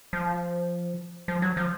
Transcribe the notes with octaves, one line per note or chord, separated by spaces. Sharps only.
F3
F3
F#3
F3